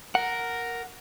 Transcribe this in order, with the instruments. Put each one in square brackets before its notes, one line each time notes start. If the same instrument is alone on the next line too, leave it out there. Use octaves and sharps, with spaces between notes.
[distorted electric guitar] A#4 [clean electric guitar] F#5